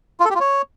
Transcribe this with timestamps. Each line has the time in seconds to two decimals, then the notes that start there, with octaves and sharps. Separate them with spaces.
0.20 F4
0.25 A4
0.30 G4
0.35 F4
0.40 C#5